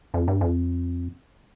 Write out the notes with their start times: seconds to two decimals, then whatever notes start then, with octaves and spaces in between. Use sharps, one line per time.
0.14 F2
0.28 G2
0.41 F2